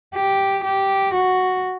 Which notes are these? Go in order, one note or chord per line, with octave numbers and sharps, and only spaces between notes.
G4
G4
F#4